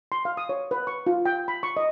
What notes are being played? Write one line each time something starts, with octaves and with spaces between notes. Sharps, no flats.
C6
F5
D#6
C#5
B4
C#6
F4
G5
B5
C#6
D#5